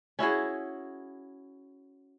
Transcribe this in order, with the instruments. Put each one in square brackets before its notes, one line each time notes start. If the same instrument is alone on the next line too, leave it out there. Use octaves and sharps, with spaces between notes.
[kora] C#4 E4 F#4 G#4